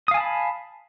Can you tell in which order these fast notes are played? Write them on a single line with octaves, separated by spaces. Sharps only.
D#6 F5 G#5 A5 B5